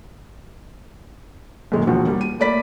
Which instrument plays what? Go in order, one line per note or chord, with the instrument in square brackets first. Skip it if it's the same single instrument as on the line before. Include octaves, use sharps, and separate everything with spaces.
[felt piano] F#2 A#2 D#3 G#3
E1 D#2 F3 F#4
G3 A#3
D#7
A3 A#3 D5 B5 B6